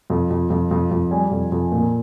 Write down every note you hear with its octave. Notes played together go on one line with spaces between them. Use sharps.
F2
F2
F2
F2
F2
G3 G#5
F2
F2
A#2